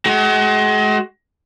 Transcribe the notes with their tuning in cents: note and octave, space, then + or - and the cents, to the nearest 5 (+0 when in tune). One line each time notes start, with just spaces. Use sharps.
G#3 +35 F#4 +35